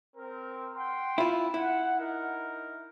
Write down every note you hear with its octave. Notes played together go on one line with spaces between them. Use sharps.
C4 A#4
F#5 G5 C6
E4 F4
E4 F#5
D#4 A#4